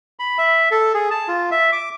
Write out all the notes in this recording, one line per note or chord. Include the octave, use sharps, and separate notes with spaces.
B5
E5
A4
G#4
A5
F4
E5
D6